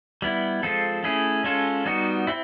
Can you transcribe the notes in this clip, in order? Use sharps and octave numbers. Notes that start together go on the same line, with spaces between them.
G3 B3 E4
F3 G#3 C4 F4 A4
A3 C#4 E4 G#4
G#3 C#4 F4 A4
G3 B3 D#4 F#4
C4 E4